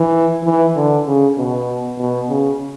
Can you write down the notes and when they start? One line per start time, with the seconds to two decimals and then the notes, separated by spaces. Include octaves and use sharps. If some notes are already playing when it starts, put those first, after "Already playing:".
Already playing: E3
0.45 E3
0.76 D3
1.07 C#3
1.38 B2
1.99 B2
2.29 C#3